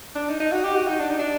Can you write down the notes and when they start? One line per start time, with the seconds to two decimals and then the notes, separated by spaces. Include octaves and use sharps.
0.15 D4
0.29 D#4
0.40 D#4
0.52 F#4
0.64 G4
0.76 F#4
0.87 D#4
0.99 D4
1.10 D#4
1.19 D4